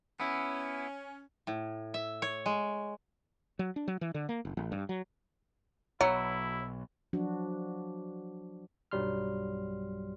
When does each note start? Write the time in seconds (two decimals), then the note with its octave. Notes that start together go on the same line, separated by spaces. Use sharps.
0.20 B3 C#4 E4
1.47 A2
1.94 E5
2.22 C#5
2.46 G#3
3.59 F#3
3.76 D4
3.88 F#3
4.01 E3
4.15 D3
4.29 A#3
4.45 F#1
4.57 A1
4.72 G2
4.89 F#3
6.01 B1 F#3 E4 C#5
7.13 F3 F#3 D4 F#4
8.91 B1 G2 F#3 G3 C6 F6